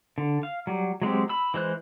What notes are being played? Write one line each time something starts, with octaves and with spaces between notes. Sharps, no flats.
D3
F5
F#3 G3
F#3 G#3 C4 G4
B5 E6
E3 G#3 C5 F#6